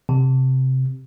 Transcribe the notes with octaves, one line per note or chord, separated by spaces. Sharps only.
C3